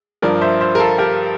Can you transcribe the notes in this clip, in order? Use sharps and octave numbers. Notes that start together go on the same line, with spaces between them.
G2 F3 A#4 D5
C5 E5
C5 E5
A#4
F4 A4
G4 A#4